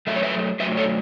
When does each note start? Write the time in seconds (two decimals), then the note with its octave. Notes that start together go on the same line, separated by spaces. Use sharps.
0.07 F#2 F#3 A3 E5
0.16 C#5
0.23 B4 E5
0.60 F#2 F#3 A3 B4 E5
0.77 A4 C#5